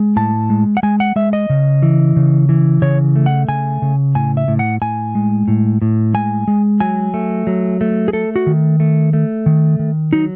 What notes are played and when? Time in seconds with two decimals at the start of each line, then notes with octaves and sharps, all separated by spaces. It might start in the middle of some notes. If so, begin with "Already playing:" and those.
Already playing: G#3
0.16 A2 A5
0.50 G#3
0.77 F#5
0.83 G#3 G#5
1.00 F#5
1.16 G#3 E5
1.33 D#5
1.50 C#3
1.82 E3
2.16 C#3
2.49 E3
2.82 C#3 C#5
3.16 A3
3.26 F#5
3.48 C#3 G#5
3.82 C#3
4.15 A2 G#5
4.37 E5
4.48 A2
4.59 F#5
4.82 A2 G#5
5.15 G#3
5.48 A2
5.82 A2
6.14 G#3 G#5
6.48 G#3
6.80 F#3 G#5
7.14 A3
7.47 F#3
7.81 A3
8.08 G#4
8.13 A3 A4
8.36 F#4
8.47 D#3
8.80 A3
9.13 A3
9.46 D#3
9.79 D#3
10.13 F#3 D#4